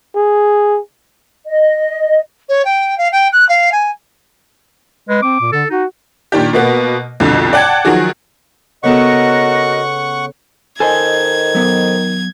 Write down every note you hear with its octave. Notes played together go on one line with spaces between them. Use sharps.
G#4
D#5
C#5
G5
F5
G5
F#6
F5
G#5
G#3 B4
C4 D6
A#2
D3 A4
D#4 F#4
A#2 D#3 D4 G4
B2 A#3 B3
C2 F2 B2 D3
D5 F#5 G5 A5 G#6
D#3 F3 F#3 F#4 G#4
C#3 B3 F#4 A4 A#4 D#5 F#5 C#6
D#3 A4 C5 D#5 G#5 G#6
F#3 B3